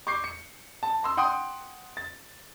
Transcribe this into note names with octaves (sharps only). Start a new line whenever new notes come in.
C#6 D6 G6 C7
C#7
A5
A#5 C6 E6
F#5 G5 C6 D#6
A6